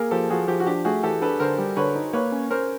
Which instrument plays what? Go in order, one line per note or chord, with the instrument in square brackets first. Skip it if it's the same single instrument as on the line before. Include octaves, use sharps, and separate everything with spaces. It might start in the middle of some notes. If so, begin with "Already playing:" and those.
Already playing: [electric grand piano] A#3 [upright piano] G#4 A#4
[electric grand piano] F3 [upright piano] G4 A4
[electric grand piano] F3 [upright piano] F#4 G#4
[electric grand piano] F3 [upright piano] G4
[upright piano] F#4
[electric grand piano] D4 [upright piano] G4
[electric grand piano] A3 [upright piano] F#4 G#4
[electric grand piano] E3 [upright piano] G4 A4
[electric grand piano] D4 [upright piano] A4 B4
[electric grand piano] D3 [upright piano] A#4 C5
[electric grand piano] G3
[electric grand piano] D3 [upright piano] B4 C#5
[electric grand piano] D#4
[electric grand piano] A#3 [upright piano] B4 C#5
[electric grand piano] C#4
[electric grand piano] C#4 [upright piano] A#4 C5